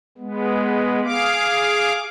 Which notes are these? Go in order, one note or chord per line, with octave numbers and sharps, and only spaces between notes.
G#3 B3
G#4 F5 D6